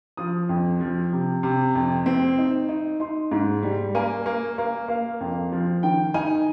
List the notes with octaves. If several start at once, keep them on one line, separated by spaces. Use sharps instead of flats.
F3 D#6
F2
F3
C3
C3
F2
C4
D#4
D#4
D#4 C6
G#2
G3
A#3 G#5
A#3
A#3
A#3 F5
F2
F3
D#3 G5
D#4 G#5